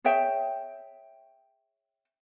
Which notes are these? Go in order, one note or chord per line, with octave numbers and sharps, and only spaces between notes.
G#4 C#5 E5 G5